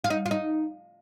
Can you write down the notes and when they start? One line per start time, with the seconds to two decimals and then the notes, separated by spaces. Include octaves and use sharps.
0.04 F4
0.10 D#4
0.26 F4
0.31 D#4